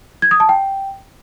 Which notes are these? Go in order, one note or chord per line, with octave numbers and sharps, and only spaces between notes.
G#6
D#6
A5
G5